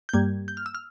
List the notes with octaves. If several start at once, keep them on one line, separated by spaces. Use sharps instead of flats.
G6
G2 G3 A#3 G#6
G6
F6
E6
F6